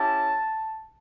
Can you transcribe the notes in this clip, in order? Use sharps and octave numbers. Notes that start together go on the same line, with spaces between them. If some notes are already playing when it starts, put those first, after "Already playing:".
Already playing: C#4 E4 G4 A5